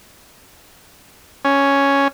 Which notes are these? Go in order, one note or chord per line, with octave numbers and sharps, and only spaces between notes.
C#4